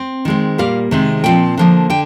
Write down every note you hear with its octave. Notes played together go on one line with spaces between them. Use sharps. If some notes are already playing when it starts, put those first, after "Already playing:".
Already playing: C4
D#3 G#3 C4
A#2 G3 A#3 F5
C3 D#3 G#3 C4
A#2 F3 C4 G5
D3 F3 A#3
D3 G5